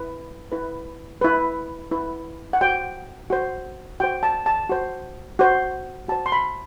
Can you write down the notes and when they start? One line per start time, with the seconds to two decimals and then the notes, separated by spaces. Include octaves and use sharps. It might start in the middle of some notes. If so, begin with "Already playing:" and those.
Already playing: E4 B4
0.52 E4 B4
1.21 E4 B4
1.91 E4 B4
2.53 F#5
2.61 F#4 C5 G5
3.30 F#4 C5
4.00 F#4 C5 G5
4.23 A5
4.46 A5
4.69 F#4 C5
5.39 F#4 C5
6.08 F#4 C5 A5
6.26 C6
6.32 B5